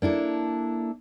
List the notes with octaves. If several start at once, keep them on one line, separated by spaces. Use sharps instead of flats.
A#3 D4 E4 A4